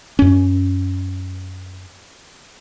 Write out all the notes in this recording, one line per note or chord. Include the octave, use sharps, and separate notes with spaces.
F#2 C#4